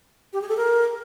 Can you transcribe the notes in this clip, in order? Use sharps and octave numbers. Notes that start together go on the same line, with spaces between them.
G4
G#4
A4
A#4